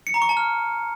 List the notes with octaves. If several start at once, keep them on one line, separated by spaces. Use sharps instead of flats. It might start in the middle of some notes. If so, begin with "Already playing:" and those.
C#7
A#5
C#6
A5
F6